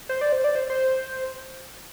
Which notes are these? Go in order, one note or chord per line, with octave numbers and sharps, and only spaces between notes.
C5
D5
C5
D5
C5
C5